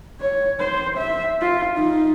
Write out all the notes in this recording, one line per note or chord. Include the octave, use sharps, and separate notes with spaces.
C#5
C5
E5
F4
D#4